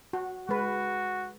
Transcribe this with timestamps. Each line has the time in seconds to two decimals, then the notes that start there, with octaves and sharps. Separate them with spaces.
0.13 F#4
0.49 G#3 F#4 B4